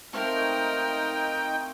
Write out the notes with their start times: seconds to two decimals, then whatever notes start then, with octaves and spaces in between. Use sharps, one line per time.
0.13 A3 C4 D#4 A#4 F5 G5